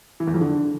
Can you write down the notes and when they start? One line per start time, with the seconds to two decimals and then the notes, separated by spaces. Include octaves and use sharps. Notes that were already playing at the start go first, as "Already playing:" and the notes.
0.20 E3
0.27 E2
0.34 F2
0.41 D3